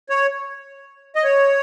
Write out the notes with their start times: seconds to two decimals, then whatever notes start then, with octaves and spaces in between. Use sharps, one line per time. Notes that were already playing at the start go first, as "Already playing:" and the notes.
0.09 C#5
1.16 D#5
1.23 C#5